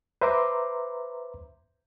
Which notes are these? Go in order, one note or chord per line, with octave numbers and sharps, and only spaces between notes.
B4 C5 E5 A#5 C6 D6